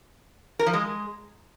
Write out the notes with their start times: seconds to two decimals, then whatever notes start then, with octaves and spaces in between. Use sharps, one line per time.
0.59 A#4
0.66 F3
0.73 G#3